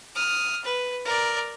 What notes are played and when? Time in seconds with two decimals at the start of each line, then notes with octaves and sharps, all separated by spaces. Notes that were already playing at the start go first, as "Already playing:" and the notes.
0.15 D#6 F6
0.64 B4
1.05 A#4 D5